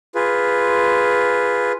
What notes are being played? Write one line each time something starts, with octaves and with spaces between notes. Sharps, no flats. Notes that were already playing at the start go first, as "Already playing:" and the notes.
F4 G#4 B4